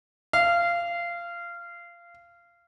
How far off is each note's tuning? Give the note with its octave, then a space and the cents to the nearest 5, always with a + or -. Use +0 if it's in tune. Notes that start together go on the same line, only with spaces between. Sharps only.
F5 -20